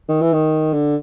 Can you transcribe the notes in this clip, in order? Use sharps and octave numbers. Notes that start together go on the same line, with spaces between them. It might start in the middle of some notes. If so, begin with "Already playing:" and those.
D#3
E3
D#3
D3